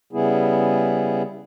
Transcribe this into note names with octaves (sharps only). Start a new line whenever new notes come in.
C#3 G3 B3 E4 G#4